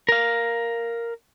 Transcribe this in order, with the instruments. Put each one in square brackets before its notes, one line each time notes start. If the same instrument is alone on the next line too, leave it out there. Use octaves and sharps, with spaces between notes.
[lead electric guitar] A#4 F5